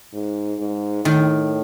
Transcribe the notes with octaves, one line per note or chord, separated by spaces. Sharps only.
G#2
G#2
A2 D#3